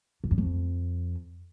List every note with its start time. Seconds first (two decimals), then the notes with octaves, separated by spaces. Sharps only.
0.24 F2
0.31 F#2
0.38 F2